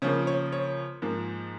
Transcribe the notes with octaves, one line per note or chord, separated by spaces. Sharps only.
C#3 F3 A#3 C#5
C#5
C#5
G#2 F3 A#3